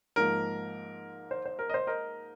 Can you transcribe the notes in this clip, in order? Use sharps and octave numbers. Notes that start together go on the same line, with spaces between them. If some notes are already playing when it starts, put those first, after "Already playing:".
G#2 F3 A#3 A#4
C5
C5
A#4
D#5
C5
A#4 D#5